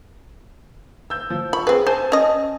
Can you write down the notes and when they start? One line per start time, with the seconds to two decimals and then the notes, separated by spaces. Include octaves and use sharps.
1.10 E6 G6
1.30 F3
1.53 B5 C#6
1.67 C4 G#4 B4
1.87 C5 G#5 A5
2.12 C#4 D#5